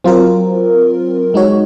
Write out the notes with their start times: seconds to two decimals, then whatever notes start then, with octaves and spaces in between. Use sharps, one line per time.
0.04 F#3 C4 F4 A#4
1.34 G#3 D#4 F#4 C#5